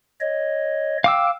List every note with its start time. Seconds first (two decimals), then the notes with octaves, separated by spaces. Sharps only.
0.21 C#5 D#5
1.04 F5 G5 D6 E6